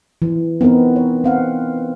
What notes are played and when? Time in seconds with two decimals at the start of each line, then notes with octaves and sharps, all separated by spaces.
0.22 E3
0.61 B3 C4 D#4 A#4
0.96 C#5
1.24 C4 F5 F#5